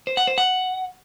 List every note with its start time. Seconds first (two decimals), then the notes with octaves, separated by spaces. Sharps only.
0.07 C5
0.17 F#5
0.27 C5
0.38 F#5